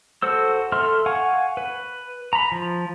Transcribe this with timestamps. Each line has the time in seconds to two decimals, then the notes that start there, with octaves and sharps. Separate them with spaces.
0.22 F#4 A4 C5 E6
0.72 A4 E5 C6 F6
1.06 F5 F#5 G#5 C#6
1.57 B4
2.33 A#5 B5
2.52 F3